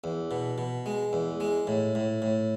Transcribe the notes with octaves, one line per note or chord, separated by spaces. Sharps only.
E2
B2
B2
G#3
E2
G#3
A2
A2
A2